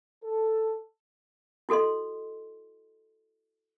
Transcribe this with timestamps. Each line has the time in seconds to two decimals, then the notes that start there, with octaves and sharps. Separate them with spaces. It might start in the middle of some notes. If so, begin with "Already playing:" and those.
0.23 A4
1.69 E4 F#4 A4 D#5 C6